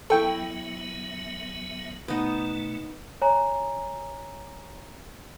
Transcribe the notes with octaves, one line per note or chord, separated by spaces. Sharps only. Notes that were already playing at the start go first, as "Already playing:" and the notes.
F#3 B3 E4 A4 E5 G5 C#6
B2 A3 B3 D#4
C#5 G#5 A#5